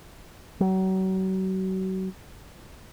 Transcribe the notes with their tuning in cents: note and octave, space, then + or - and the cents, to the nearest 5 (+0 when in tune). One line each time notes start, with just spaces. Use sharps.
F#3 +35